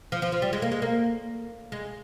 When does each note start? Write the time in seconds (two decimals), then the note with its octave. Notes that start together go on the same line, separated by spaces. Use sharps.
0.12 F3
0.22 F3
0.32 F3
0.42 G3
0.53 G#3
0.62 A#3
0.72 G#3
0.82 A#3
1.72 G#3